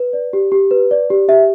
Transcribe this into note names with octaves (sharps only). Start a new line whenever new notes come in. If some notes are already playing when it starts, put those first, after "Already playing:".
Already playing: B4
D5
G4
G4
B4
D5
G4
G4 E5